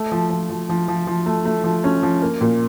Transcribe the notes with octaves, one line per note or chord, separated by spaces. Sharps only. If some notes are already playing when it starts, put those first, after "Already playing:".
Already playing: A3
F3
F3
F3
F3
F3
F3
A3
A3
F3
C#4
F3
A#3
A#2